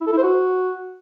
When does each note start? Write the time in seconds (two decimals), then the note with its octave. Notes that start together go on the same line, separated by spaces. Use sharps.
0.01 E4
0.06 A4
0.12 E4
0.17 C5
0.23 F#4